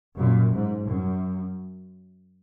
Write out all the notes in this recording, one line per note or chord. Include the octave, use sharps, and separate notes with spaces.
F#2 A#2
G#2
F#2